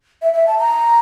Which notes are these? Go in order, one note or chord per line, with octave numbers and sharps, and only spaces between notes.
E5
E5
A5
A#5